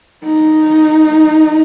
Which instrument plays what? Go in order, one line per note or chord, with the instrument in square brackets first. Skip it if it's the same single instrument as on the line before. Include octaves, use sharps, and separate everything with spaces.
[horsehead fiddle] D#4